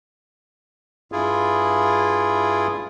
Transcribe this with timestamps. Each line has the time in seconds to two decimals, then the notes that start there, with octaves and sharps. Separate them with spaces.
1.12 G2 E4 F4 G#4